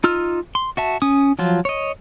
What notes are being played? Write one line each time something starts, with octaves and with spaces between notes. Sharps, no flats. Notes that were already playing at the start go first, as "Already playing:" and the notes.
D#4 F4 E6 F6
C6
F#4 E5 A5
C#4 D#6
F3 F#3 F4
C#5 D#5